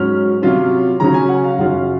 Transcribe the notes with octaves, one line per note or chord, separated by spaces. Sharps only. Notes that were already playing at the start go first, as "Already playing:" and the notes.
Already playing: G#2 F#3 C#4 F6
C3 F#3 C#4 F4
C#3 F#3 C#4 A#5
G#5
F#5
F5
F#2 C#3 F#3 C#4 F4 F#5